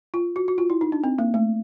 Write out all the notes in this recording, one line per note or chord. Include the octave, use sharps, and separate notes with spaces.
F4
F#4
F#4
F4
E4
D#4
D4
C4
A#3
A3